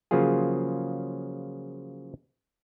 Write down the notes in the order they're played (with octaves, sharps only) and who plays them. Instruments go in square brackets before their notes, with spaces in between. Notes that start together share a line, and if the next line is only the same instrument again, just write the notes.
[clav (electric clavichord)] C#3 F3 F#3 A#3 F4 G#4